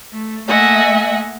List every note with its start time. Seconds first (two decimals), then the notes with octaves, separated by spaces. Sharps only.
0.12 A3
0.48 A3 A#3 D#5 E5 F#5 G#5